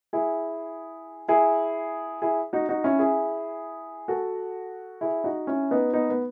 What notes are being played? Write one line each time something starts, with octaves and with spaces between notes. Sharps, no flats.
E4 G#4
E4 G#4
E4 G#4
D#4 F#4
D#4 F#4
C#4 E4
E4 G#4
F#4 A4
E4 G#4
D#4 F#4
C#4 E4
B3 D#4
B3 D#4
B3